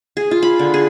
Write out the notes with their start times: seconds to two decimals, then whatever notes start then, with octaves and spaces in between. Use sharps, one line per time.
0.17 G#4
0.31 F4
0.43 B5
0.59 D3
0.74 G#4